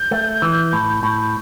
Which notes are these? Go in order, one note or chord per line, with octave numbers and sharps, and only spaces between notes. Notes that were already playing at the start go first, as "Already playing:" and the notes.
Already playing: G6
A3
E3
A2
A2